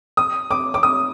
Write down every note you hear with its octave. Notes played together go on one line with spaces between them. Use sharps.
D#6
D6
D6
D#6